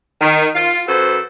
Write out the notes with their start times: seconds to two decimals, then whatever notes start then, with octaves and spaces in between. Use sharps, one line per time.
0.21 D#3
0.55 F4
0.87 F#2 F#4 A4 B4 C5